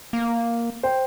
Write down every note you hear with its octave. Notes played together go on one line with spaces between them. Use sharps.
A#3
C5 G5